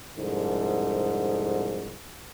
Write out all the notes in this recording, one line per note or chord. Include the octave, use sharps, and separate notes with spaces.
C2 F2 G#2 D3